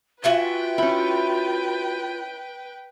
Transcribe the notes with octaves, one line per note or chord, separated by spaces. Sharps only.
F4 F#4 B4 E5 G5 G#5
C#4 E4